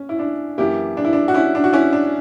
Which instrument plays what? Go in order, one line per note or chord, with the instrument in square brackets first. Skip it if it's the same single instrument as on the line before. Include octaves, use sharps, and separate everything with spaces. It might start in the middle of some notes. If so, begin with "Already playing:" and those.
Already playing: [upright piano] C#4
E4
D4
F#2 E3 A#3 E4 G4
D4
E4
D4
F#4
C#4 E4
D4
F#4
C#4 E4
D4